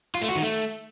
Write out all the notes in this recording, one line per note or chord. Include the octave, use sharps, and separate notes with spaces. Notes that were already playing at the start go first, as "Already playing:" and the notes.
F4
A3
F#4
D#3
A3